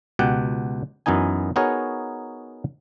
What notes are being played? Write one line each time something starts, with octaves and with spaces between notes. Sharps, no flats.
C#2 B2 G4 F#5 G5
F#2 E3 B3 D#4 G#5
B3 D#4 F#4 G#4 A#4 C#5